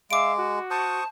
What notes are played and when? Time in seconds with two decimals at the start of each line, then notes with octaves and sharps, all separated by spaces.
0.11 G#3 E5 F5 D6 D7
0.37 F#4
0.71 C5 A5 C#6 D#6